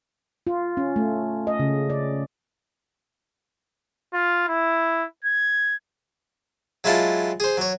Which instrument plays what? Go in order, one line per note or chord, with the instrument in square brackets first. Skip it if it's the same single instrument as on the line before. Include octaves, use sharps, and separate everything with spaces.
[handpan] F4
C#4
A3
D#5
C#3
D5
[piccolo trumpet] F4
E4
G#6
[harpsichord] F#3 G#3 E4 F4 A5
G#4 C5
F#3 C#5